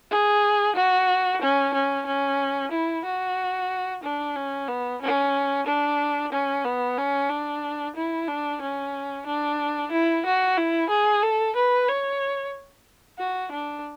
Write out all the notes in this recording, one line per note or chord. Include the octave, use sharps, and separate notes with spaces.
G#4
F#4
C#4
C#4
C#4
E4
F#4
D4
C#4
B3
C#4
D4
C#4
B3
C#4
D4
E4
D4
C#4
D4
E4
F#4
E4
G#4
A4
B4
C#5
F#4
D4